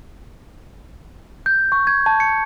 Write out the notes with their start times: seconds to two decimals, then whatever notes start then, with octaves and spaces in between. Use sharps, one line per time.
1.46 G6
1.72 C#6
1.87 G#6
2.06 A5
2.20 C#7